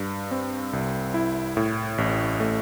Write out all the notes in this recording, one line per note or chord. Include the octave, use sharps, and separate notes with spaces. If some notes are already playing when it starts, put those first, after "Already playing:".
Already playing: G2
C4
C2
E4
A2
A1
A3